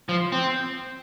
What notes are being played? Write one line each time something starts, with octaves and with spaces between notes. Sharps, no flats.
F3
C4